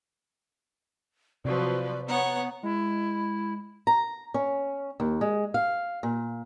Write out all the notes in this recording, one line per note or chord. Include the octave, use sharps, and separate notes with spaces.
C3 F3 F#3 B4 D5
B3 C#5 F#5 A#5
G#3 E4
A#5
C#4
D#2
G#3
F5
A#2